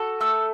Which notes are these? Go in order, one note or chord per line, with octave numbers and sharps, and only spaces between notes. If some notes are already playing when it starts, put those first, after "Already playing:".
Already playing: F#4 A4
A3 E6